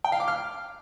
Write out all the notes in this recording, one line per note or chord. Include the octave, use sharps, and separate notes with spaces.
G5
F5
D6
F6